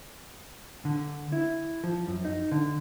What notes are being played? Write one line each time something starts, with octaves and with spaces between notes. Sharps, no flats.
D3
E4
F3
F#2
D#4
D3